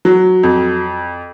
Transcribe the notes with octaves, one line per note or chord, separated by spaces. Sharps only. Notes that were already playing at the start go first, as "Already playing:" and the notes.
F#3
F2